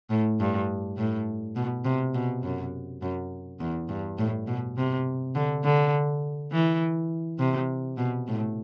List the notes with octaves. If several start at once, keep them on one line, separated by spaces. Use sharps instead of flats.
A2
G2
A2
B2
C3
B2
F#2
F#2
E2
G2
A2
B2
C3
D3
D3
E3
C3
B2
A2